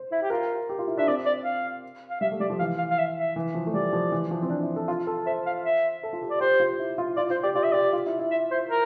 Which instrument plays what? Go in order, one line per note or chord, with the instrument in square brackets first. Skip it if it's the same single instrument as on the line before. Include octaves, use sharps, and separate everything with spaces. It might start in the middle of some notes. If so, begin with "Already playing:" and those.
Already playing: [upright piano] C5
[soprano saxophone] E4
G4
[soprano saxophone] F4 [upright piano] A#4
[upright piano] G4
F4
E4
[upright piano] D4 [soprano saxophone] E5
[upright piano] C4 [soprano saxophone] D5
[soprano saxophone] D5
F5
F5
[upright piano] G3 [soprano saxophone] E5
[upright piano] A3
[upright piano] G3 [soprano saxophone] D5
[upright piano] F3
[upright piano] E3 [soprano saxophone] F5
[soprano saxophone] F5
F5
E5
E5
[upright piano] E3
F3
A3
[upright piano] G3 [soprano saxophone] D5
[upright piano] F3
E3
F3
C4
D4
E4
A4
F4
A4
[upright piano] C5 [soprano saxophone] E5
[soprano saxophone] F5
E5
[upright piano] A4
F4
G4
[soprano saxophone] D5
[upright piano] G4 [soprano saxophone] C5
[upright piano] F4
E4
F4
[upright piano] F4 [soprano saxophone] D5
[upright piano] F4 [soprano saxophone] C5
[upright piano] G4 [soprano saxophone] D5
[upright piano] F4 [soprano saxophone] D5
[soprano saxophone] E5
[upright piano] G4 [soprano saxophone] D5
[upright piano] F4
E4
E4
[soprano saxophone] E5
C5
A#4